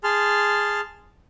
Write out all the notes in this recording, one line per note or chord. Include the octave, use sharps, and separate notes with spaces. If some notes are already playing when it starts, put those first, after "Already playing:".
G#4 A5 C6 F6